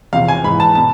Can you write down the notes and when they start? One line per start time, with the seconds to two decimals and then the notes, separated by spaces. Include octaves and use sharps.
0.13 E2 C3 F3 F5
0.28 G#5
0.44 G#2 E3 B5
0.60 A5
0.75 B2 A5